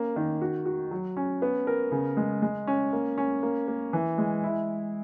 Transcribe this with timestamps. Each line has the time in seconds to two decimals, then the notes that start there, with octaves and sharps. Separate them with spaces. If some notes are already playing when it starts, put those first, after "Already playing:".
Already playing: A#3 C#4
0.16 D#3
0.42 F#4
0.66 F#4
0.91 F#3
1.17 C#4
1.42 B3
1.67 A#4
1.92 C#3
2.17 G#3
2.42 G#3
2.67 C#4
2.93 A#3
3.18 C#4
3.43 A#3
3.68 A#3
3.93 E3
4.18 G#3
4.44 E4